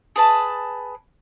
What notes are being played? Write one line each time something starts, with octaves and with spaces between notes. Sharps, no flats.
G#4 B4 A5